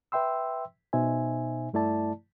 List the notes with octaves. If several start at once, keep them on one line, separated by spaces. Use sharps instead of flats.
B4 E5 G5 C6 E6
B2 D#4 C5 E5 G#5
G2 A3 E4 D5 A5